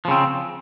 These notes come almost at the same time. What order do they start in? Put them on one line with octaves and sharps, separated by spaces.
F3 C#3 C4